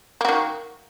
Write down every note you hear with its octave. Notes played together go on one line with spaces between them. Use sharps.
D#3 A#3 F#4